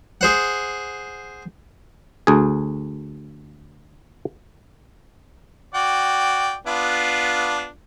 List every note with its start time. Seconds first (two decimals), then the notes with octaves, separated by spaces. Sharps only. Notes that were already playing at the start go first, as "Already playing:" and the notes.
0.21 G#4 C5 F#5
2.27 D2 G#4
5.75 F#4 D5 G5
6.67 B3 D4 F4